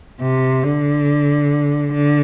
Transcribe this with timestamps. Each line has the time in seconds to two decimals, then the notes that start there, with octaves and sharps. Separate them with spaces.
0.22 C3
0.64 D3
1.93 D3